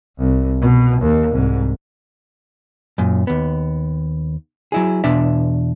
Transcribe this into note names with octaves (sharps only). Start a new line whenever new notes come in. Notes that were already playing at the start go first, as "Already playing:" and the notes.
C2
B2
D#2
C2 G#2
F#2 A#2
D#2 B3
F#3 E4 G#4
E2 B2 D4 E5